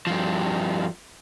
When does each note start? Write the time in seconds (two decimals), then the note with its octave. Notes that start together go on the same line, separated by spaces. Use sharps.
0.07 G2 F3